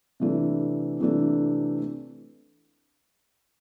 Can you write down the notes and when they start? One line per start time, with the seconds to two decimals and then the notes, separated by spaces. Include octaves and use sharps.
0.20 C3 E3 A3 D4
1.00 C3 E3 A3 D4